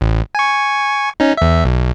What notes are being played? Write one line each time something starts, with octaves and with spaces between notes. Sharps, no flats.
A1
G#5 C#6
C#4 D#4
E2 E5
B1